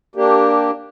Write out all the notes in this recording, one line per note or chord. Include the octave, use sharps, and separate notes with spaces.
A#3 D4 G4